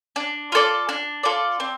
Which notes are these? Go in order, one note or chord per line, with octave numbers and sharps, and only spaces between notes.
D4
F4 A4 D5
D4
F4 A4 D5
C4